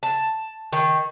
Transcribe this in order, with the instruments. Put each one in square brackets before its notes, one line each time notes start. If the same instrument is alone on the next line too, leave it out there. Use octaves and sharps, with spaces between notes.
[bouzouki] A5
D#3